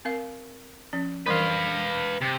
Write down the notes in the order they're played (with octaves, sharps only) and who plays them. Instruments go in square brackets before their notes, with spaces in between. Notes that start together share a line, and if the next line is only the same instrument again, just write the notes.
[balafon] C4 A#4 F5
F3 C#4
[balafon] E3 G3 A#4 [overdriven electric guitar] B4 F5
[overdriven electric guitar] C3